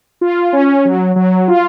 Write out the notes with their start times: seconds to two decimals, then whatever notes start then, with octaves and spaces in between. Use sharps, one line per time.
0.21 F4
0.53 C#4
0.85 F#3
1.16 F#3
1.48 F4